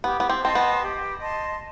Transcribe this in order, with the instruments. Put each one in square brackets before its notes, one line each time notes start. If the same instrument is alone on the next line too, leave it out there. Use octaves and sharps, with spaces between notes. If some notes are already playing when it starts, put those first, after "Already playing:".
[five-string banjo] B3 [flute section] G4
[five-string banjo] B3
C4
[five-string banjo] C4 [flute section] D#5 A5 C6
[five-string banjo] B3
[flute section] G4
D#5 A5 C6